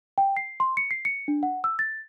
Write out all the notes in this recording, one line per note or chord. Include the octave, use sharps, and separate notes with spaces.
G5
C7
C6
C#7
C7
C#7
D4
F#5
E6
A6